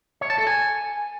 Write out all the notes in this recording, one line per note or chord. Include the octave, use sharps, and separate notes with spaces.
C#5
A5
A4
G#5